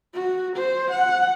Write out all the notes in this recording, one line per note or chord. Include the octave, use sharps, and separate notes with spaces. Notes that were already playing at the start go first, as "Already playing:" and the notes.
F#4
C5
F#5